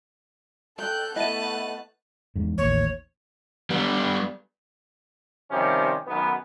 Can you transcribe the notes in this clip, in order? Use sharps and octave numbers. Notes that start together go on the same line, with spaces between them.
A4 G5 F#6 G6
A3 B3 E4 D#5 A5 F#6 D#7
E2 G#2
A1 D#2 C#5
G3 B3
C3 D#3 F3 G3 C#4 G4
B1 F#2 D#3 B3